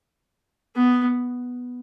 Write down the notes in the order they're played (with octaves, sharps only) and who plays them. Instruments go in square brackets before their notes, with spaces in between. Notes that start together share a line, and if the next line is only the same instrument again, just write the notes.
[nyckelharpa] B3